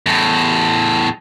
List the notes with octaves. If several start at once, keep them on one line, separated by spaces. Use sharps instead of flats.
E2 A2